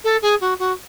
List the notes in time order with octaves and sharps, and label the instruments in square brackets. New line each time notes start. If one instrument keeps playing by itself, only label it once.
[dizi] A4
G#4
F#4
F#4